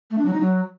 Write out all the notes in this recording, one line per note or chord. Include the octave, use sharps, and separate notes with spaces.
A3
D4
F#3
D#4
F#3